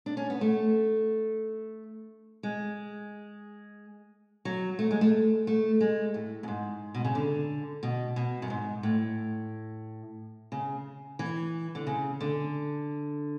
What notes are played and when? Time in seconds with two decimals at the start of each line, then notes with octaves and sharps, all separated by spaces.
0.06 D4
0.17 C#4
0.30 B3
0.41 A3
2.43 G#3
4.45 F#3
4.79 A3
4.91 G#3
5.01 A3
5.47 A3
5.81 G#3
6.14 A2
6.43 F#2
6.48 G#2
6.94 B2
7.04 C#3
7.15 D3
7.83 B2
8.16 B2
8.42 F#2
8.50 G#2
8.83 A2
10.52 C#3
11.19 E3
11.75 D3
11.87 C#3
12.21 D3